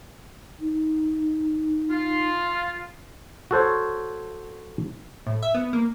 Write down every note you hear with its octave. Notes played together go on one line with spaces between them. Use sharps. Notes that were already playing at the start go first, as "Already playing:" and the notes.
D#4
F4
F#4 A4 C5 C#5
A2
E5
B3
A#3